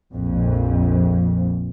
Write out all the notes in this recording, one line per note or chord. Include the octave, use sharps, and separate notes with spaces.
A#1 F2